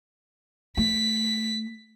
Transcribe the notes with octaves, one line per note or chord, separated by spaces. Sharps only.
A3 B6